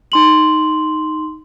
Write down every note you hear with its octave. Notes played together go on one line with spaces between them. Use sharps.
D#4 C6 F#7